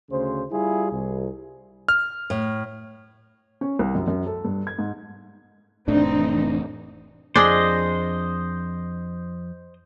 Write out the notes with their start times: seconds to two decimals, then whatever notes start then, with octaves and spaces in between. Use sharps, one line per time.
0.10 D2 C#3 C5
0.51 G3 E4 F4 G#4
0.91 C2
1.88 F6
2.30 A2
3.61 C#4
3.79 C2
3.95 F#2
4.08 F#2
4.26 A4
4.45 G2
4.67 G#6
4.79 G#2
5.88 F1 A2 E3 A3 C4 D4 D#4
7.36 F2 D4 G#4 C5 D#5